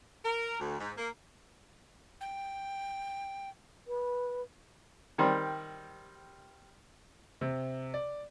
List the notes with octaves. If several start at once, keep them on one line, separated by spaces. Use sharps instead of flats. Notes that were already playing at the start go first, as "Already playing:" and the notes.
A#4
D2
G#2
A#3
G5
B4
D#3 G3 C4
C3
D5